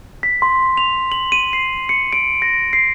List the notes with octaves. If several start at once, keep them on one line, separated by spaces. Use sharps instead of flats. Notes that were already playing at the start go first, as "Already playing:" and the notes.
B6
C6
F7
F#7
D#7
C7
C#7
D7
A#6
C7